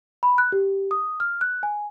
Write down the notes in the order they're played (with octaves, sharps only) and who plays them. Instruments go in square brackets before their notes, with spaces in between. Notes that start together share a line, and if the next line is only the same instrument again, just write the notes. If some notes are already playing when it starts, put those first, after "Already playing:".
[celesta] B5
F#6
G4
D#6
F6
F#6
G#5